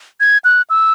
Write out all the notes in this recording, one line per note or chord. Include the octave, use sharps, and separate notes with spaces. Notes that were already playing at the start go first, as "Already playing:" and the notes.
G#6
F#6
E6